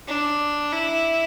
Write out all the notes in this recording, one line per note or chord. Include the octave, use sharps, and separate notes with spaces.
D4
E4